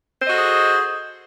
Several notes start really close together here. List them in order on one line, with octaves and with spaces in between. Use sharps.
C5 D#5 F#4 A4 G#4